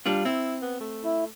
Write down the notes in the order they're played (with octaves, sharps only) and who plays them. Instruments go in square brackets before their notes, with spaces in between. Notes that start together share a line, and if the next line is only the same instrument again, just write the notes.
[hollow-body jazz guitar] G3 D4 F4
[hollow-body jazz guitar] C4 [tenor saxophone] E4
[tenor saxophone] B3
A3
[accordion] E4